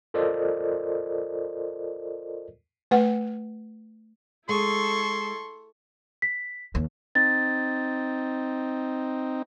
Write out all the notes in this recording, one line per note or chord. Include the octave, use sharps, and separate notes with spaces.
F4 A4 A#4 C5 D5 D#5
A3 B4 F#5
G#3 E4 A4 C6 C#6
B6
D#2
C4 D#4 A6